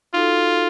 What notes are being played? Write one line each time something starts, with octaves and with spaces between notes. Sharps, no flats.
D#4 F4 F#4 A4